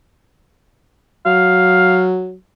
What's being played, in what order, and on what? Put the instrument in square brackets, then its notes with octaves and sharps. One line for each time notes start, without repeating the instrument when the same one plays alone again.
[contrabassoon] F#3 [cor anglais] F5